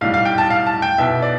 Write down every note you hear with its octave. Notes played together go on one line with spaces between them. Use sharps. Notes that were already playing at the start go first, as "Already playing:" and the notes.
B1 A2 G3 F5
F5
G5
A5
F5
A5
G5
B1 B2 B3 E4 E5
D5